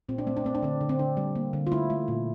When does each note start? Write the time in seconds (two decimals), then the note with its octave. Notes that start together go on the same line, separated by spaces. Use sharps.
0.09 A#2 C4
0.18 D4
0.27 A3 C4
0.37 D4
0.45 A3 C4
0.55 D4
0.62 D3 C4
0.81 D3
0.89 C4
0.99 D3 D4
1.17 G3
1.36 A#3
1.53 D3
1.67 F4
1.72 A3 E4
1.90 A3
2.08 A#2